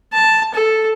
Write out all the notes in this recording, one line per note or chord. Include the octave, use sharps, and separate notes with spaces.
A5
A4